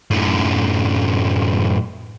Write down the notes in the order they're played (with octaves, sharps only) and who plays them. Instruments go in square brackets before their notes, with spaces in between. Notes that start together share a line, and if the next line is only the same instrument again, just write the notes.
[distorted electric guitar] F#2 A2